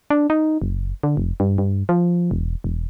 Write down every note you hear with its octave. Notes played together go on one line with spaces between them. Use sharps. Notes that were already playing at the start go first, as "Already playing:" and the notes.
D4
D#4
F#1
D3
F1
G2
G2
F3
E1
E1